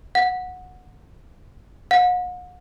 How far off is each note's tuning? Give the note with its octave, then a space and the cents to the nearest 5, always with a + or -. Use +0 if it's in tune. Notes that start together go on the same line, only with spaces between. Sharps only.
F#5 -15
F#5 -40